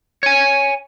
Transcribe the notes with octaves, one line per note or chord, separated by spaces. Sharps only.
C#5 G#5